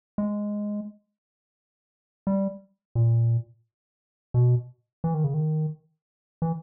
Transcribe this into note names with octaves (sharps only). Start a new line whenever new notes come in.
G#3
G3
A#2
B2
E3
D#3
C#3
D#3
E3